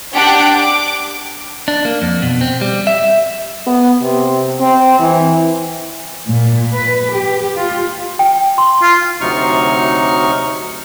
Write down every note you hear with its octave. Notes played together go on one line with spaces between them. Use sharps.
D4 G4 F#5 F#6 D7
D6
D4
A#3
F2
B2
C4
G3
E5
B3
C3
C4
E3
A#2
B4
G4
F4
G5
C6
F4
D2 C3 F#3 D#4 C#6 F6